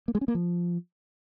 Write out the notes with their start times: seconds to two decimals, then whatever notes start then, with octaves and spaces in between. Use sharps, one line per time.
0.08 A#3
0.15 G#3
0.21 C#4
0.28 A#3
0.35 F3